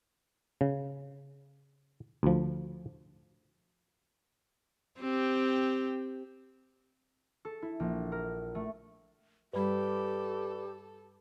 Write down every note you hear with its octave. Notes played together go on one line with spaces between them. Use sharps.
C#3
D2 F3
C4 G4
A4
E4
A#1
A#4
A3
G2 G3 G4 A4 B4 D5 B5